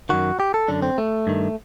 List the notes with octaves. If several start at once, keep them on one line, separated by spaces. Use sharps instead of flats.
F#2 D#3 F#4
G4
A4
F#2 D3 D4
C4
A3
G2 D#3